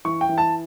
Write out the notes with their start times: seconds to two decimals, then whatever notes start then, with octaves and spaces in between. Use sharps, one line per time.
0.05 E3 C#6
0.21 G5
0.29 E3
0.38 A5